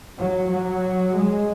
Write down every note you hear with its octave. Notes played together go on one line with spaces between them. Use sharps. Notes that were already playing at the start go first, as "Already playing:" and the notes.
F#3
F#3
G#3